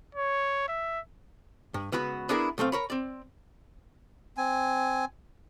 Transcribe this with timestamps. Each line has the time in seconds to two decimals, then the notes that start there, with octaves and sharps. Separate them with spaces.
0.15 C#5
0.68 E5
1.74 G2
1.92 C#2 B3 F#4 B4
2.29 B3 D4 E4 G#4 A#4
2.58 B1 A3 C4 F5
2.72 A#4 C#5 B5
2.90 C4 D5
4.37 C4 G#5